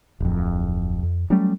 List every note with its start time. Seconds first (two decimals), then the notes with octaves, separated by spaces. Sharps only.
0.20 D1 F2
1.03 F2
1.30 F#3 G3 A3 C#4